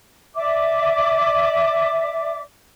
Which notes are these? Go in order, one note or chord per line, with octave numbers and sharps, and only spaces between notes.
D5 E5 D6